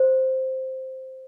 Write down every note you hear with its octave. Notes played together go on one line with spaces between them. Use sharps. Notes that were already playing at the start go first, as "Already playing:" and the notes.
Already playing: C5